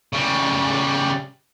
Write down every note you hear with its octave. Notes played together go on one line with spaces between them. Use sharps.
C#3 G3